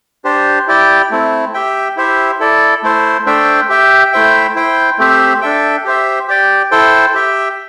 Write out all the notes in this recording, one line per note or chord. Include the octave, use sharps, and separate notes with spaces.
D4 G4 C5
E4 G4 D5 G5
A3 C4 E4
G4 E5 G5
E4 G4 C5 E5
E4 A4 D5
A3 E4 C5
A3 D4 C5 E5 G5
G4 E5 G5
A3 E4 C5 E5 G5
E4 C5 G5
A3 C4 G4 C5 E5
D4 A4 E5 G5
G4 C5 E5
G4 D5 G5
E4 A4 C5 G5
G4 E5 G5